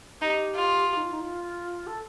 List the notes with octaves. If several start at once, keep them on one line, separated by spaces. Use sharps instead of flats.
D#4 G4
F4
G4
D#4
F4
D#4
F4
A4